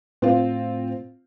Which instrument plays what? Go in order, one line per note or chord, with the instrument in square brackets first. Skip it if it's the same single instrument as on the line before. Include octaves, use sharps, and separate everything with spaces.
[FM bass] A2 [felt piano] C4 F4